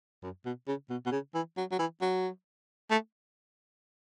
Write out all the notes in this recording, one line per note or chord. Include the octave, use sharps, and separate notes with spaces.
F#2
B2
C#3
B2
B2
C#3
E3
F#3
F#3
E3
F#3
A3